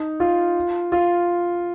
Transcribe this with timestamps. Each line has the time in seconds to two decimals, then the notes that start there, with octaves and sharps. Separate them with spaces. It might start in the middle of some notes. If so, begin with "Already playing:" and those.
Already playing: D#4
0.20 F4
0.92 F4